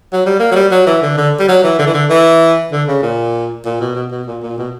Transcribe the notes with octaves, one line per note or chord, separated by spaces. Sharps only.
F#3
G3
A#3
F#3
G3
F#3
E3
D3
D3
G3
F#3
E3
D3
E3
D3
E3
D3
C#3
A#2
A#2
B2
B2
B2
A#2
A#2
B2